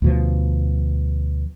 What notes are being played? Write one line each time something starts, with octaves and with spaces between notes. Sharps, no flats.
D2 B2 F3